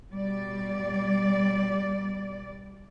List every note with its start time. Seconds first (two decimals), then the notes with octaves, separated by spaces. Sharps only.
0.13 B2 G3 D5